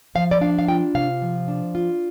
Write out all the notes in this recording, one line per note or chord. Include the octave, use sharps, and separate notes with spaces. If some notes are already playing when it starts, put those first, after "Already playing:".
F3 F5
D5
D4 F5
F5
F4 G5
C3 F5
F3
D4
F4